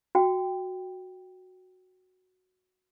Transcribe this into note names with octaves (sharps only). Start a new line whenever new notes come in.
F#4 G5